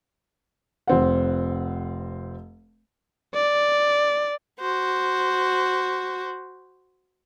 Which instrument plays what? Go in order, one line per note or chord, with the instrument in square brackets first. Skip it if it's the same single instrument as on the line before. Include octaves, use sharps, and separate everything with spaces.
[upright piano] F1 C4 F#5
[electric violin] D5
[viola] F#4 C5